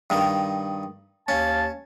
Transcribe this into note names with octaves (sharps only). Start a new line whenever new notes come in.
G2 D#3
D#2 C#4 F5 A5